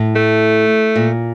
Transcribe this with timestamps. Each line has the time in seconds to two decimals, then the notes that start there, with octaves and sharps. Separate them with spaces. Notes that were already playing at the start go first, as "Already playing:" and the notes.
Already playing: A2
0.16 A3
0.96 A#2